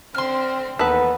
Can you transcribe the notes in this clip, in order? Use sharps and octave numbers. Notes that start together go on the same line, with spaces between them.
D3 C4 C6 F6
D#2 E3 B3 D#4 A4 B4